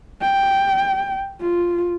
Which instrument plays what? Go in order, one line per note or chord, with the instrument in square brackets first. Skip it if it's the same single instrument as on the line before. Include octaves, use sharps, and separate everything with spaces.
[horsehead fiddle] G5
F4